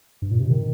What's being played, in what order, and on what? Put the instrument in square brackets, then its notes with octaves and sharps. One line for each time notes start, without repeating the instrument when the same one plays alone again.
[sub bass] G2
A#2
C3
D#3